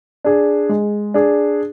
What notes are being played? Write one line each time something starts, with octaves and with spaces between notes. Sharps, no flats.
D4 G#4
G#3
D4 G#4